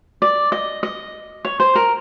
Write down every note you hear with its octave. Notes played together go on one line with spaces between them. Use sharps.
D5
D#5
D#5
C#5
C5
A#4